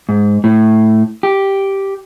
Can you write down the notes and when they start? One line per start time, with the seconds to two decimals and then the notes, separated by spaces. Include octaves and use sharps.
0.09 G#2
0.44 A2
1.23 G4